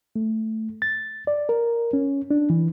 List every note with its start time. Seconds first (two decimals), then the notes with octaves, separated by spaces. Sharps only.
0.16 A3
0.82 A6
1.27 D5
1.49 A#4
1.93 C#4
2.31 D4
2.50 E3